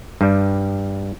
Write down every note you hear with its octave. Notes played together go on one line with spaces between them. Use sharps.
G2 G3